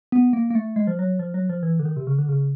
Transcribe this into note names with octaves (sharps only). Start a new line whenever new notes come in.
B3
A#3
A#3
A3
G#3
F3
F#3
F3
F#3
F3
E3
D3
D#3
C3
C#3
D3
C#3